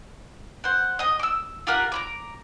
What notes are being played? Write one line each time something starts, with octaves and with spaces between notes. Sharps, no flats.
C5 F#5
D#5 D#6
D6 E6
F4 G4 A#4 F#5
A#5 B5 D6